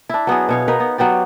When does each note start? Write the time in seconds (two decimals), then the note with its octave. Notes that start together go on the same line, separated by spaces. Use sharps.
0.09 D4 E4
0.27 F#3 B3 F#4 G#4
0.49 B2 C#5 F5
0.68 D#4 A#4 B4
0.80 B3
0.98 F#3 B3 G4 D5